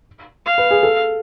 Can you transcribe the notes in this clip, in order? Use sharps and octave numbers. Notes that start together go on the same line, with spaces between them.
F5
B4
G#4
A4